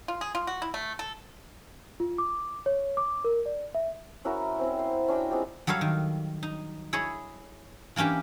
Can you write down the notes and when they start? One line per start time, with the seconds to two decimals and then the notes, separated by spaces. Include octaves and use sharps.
0.08 F4
0.21 G#4
0.35 F4
0.47 F#4
0.62 E4
0.74 A3
0.99 A4
2.00 F4
2.18 D6
2.66 C#5
2.97 D6
3.24 A#4
3.46 D5
3.75 E5
4.25 C#4 E4 F#4 A#4
4.59 C4 C#4 E4
4.79 C5
5.08 C#4 D4 F#4 G5
5.30 G#3 C4 F4 G4
5.67 F#3 G3 A4 C#5 F5
5.81 D#3
6.43 D#4
6.93 E4 G#4 C#5 D#5
7.96 E3 A#3 C#4 D4 G4